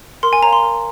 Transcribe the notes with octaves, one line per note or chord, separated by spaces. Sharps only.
A#4 C6
G#5
C#5 F5 A#5
C6
A#4